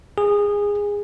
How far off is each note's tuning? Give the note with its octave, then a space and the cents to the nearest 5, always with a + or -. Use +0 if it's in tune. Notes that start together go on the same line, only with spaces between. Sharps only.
G#4 -20